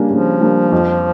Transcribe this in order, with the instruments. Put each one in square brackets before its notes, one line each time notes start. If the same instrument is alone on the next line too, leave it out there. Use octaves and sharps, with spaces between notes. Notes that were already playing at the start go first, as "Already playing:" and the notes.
Already playing: [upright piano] C#3 G3 A#3 D4
[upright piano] C#3 [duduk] F3
[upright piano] G3 A#3 D4
F2